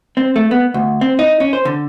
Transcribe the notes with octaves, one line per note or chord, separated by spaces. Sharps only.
C4
A3
B3
D2
C4
D#4
C#4
C5
D3